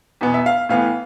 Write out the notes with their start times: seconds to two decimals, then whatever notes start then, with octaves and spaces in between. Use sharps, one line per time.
0.21 E2 B2 B3
0.34 E5
0.46 F5
0.69 A2 E3 B3 F5